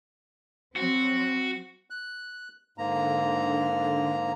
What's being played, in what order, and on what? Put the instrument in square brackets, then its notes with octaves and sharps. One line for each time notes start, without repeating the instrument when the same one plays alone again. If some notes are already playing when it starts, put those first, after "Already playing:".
[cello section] F#3 C4 [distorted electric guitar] F#4
[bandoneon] F#6
[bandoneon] G#2 A#3 A#5 [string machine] D3